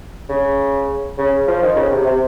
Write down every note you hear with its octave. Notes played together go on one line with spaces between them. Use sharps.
C#3
C#3
F3
D#3
C#3
C3
C3